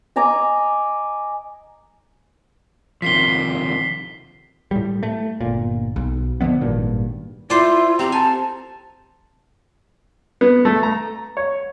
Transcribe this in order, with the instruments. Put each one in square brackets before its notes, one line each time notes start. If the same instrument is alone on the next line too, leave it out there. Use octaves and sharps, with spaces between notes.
[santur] D#5 G#5 A#5 D6
[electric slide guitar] C3 D#3 F3 [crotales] B6 C7 G7
[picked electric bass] A2 G3
A3
G1 A#2
B1
D3 F3 G#3 B3
G#1 G2 A#2
[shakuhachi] E4 [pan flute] F4 [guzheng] C5 D5
[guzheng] C4 [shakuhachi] G4 [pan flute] A#5
[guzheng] G#5 [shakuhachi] A5
[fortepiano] B3
A3
A#5
C#5